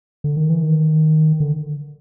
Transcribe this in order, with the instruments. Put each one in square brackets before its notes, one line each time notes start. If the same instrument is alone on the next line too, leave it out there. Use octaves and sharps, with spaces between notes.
[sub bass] D3
D#3
E3
D#3
D3